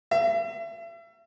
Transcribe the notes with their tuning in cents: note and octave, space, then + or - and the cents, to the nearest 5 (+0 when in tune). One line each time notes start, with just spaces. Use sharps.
E5 +40